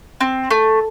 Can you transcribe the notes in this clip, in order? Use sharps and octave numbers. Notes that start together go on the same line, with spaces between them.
C4
A3